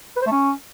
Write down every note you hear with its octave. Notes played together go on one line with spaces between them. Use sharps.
B4
C5
A3
C#4